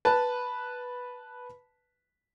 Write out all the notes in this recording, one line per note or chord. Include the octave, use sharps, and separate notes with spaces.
B4 A5